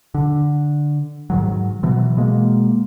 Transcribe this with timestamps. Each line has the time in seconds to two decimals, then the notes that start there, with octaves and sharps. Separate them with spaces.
0.14 D3
1.30 G#2 D#3 F#3
1.83 B2 E3 F#3
2.17 B2 G#3 A#3